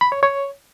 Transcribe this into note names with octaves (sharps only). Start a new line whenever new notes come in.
B5
C#5
C#5